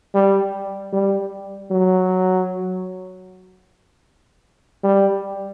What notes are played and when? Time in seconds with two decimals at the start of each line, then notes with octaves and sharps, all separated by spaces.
0.14 G3
0.93 G3
1.71 F#3
4.84 G3